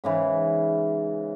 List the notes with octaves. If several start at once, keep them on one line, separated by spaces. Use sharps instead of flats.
G#2 C#3 E3